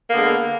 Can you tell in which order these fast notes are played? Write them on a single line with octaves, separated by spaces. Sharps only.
A#3 B3 D3 G#3